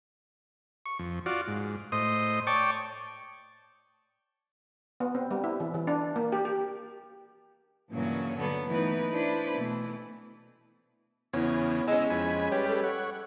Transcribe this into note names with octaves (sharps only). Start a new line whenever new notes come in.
C#6
F2
F4 F#4 D5
G#2
A2 C5 D#5 D#6
C#5 D5 G5 A5 C#6 D6
B3
C4
G3
E4
E3
E3
D4
A#3
G4
G4
G2 A#2 C#3 E3 F#3 C#4
D3 F#3 G3 B3 A4
E3 A3 B3 D#4 B4
D4 E4 B4 C5
B2 E3 A3
E2 C#3 B3 E4 C#5
G#3 C#4 G#4 E6
F2 G#5 B5
G3 G4 B4 C#5
A4
C#5 F#5